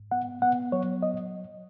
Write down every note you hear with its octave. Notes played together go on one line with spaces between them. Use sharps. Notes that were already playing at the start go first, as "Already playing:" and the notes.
Already playing: G#2
B3 F#5
B3 F#5
F#3 C#5
D#5